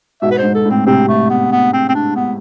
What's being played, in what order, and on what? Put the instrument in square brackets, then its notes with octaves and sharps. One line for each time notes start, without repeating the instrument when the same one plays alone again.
[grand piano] G#2 B2 [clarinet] E5
[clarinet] B4
[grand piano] G#2 [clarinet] C5
[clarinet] A4
[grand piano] A2
[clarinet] C4
[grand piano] A2 C3 [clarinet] C4
[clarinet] A3
B3
B3
C4
C4
D4
B3